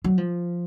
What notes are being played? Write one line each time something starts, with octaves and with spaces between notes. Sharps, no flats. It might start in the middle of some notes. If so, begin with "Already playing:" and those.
F#3
F3